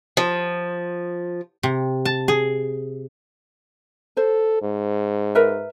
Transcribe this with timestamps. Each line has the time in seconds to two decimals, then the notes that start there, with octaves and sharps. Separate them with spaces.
0.17 F3
1.63 C3
2.05 A5
2.28 G#4
4.17 A4 C5
4.62 G#2
5.35 A#4 B4 E5